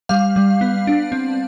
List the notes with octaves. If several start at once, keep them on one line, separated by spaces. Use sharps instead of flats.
G3 F5
G3
B3
D4
C4